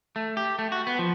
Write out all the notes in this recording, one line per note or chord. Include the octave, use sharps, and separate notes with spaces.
A3
G4
A3
F#4
B3
F3